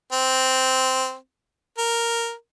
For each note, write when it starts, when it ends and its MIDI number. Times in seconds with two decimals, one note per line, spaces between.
0.13 1.15 60
1.78 2.32 70